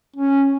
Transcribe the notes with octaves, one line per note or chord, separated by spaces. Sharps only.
C#4